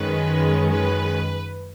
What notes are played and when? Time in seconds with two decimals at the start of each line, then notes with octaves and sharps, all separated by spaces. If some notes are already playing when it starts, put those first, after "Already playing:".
Already playing: F#2 D#3 G#3 C#4 B4
0.70 B4